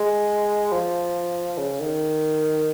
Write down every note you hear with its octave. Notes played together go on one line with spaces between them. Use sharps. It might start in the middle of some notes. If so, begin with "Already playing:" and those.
Already playing: G#3
F3
C#3
D#3